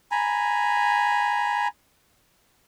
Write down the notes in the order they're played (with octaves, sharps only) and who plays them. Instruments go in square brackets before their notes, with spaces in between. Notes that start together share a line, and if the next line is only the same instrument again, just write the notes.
[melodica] G#5 A#5 B5